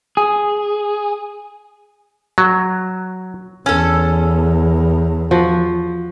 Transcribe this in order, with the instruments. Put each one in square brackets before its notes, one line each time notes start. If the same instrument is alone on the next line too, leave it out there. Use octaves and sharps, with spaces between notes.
[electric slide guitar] G#4
[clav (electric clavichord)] F#3
[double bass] E2 [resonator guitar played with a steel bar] C#4 A4
[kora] F3 F#4